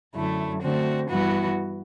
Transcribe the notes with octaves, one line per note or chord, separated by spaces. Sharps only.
F#2 D3 A3 E4
D3 A3 C4 F#4
G2 E3 B3 F#4